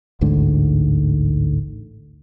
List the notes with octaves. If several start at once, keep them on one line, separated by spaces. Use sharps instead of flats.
A1 D2 G#2 D3